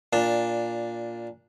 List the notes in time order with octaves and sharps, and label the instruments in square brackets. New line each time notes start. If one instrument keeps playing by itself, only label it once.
[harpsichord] A#2 D4